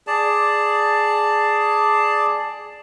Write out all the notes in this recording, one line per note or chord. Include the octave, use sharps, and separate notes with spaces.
G#4 D5 A5